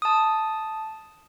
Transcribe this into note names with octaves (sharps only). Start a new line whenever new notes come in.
A5 D#6